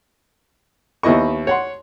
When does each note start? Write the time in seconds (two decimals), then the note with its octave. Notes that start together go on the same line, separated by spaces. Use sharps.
1.03 D#2 B3 E4 D#5 C#6
1.47 C#5 F#5 C6